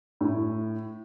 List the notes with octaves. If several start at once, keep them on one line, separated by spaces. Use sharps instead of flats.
A2